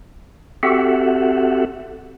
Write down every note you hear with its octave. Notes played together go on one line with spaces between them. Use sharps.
C4 F#4 G4 A4 E5 F#5